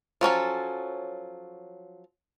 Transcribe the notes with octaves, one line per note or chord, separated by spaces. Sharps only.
F3 F#3 C#4 A4